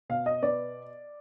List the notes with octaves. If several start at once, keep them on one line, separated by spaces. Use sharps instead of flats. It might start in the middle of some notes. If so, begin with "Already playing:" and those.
B2 F5
D#5
B3 D5